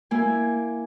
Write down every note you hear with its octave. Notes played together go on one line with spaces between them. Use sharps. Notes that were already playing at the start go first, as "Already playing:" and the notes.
A#3 E4 G#5